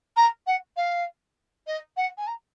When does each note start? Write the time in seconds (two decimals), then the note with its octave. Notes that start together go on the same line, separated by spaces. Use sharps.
0.17 A#5
0.47 F#5
0.77 F5
1.67 D#5
1.97 F#5
2.18 G#5
2.27 A#5